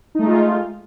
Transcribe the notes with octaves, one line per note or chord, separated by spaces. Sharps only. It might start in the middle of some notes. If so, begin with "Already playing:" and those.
G#3 A3 D#4 F4